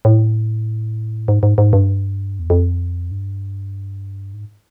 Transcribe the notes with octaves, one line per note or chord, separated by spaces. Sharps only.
A2
G#2
G#2
G#2
G2
E2
F2
G2
G#2